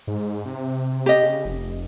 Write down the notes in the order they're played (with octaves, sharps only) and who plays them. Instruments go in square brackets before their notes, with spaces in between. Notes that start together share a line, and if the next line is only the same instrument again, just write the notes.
[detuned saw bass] G#2
C3
[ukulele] G4 D#5
[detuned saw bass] C#3
F1